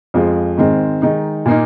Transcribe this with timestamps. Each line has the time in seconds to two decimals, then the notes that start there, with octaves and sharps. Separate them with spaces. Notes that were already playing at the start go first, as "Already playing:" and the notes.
0.14 F2 F3 G#3 F4
0.58 G#2 D#3 G#3 C4
1.02 D#3 G#3 D#4
1.46 A#2 A#3 D#4